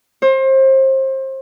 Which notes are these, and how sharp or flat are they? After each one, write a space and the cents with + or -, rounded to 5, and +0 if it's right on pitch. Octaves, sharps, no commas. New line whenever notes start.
C5 +30